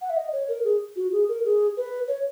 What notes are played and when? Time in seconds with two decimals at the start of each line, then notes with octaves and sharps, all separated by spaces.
0.01 F#5
0.10 E5
0.17 D#5
0.32 C#5
0.48 A#4
0.64 G#4
0.96 F#4
1.12 G#4
1.29 A#4
1.45 G#4
1.77 B4
2.08 C#5